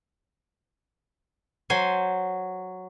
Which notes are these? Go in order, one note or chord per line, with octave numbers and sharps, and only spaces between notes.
F#3 C5 G#5